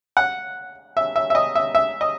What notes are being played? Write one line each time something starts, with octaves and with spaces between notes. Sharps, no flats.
F#5
E5
E5
E5
D#5
E5
E5
D#5